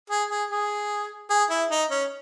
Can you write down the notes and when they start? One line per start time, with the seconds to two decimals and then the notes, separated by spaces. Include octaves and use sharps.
0.10 G#4
0.30 G#4
0.51 G#4
1.30 G#4
1.50 E4
1.71 D#4
1.90 C#4